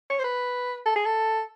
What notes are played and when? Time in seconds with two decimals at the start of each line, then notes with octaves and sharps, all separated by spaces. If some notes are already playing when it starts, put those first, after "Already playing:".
0.10 C#5
0.19 C5
0.24 B4
0.86 A4
0.96 G#4
1.06 A4